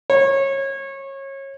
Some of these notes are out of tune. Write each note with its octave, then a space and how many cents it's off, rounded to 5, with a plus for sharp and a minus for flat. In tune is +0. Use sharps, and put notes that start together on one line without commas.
C#5 -25